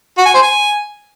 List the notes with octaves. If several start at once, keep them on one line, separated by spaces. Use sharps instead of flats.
F#4
G#5
C5
G#5